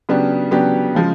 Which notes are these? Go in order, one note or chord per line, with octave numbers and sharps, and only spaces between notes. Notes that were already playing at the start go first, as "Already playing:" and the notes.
C#3 F#3 B3 D4 G4
C#3 F#3 B3 D4 G4
C#3 F3 G#3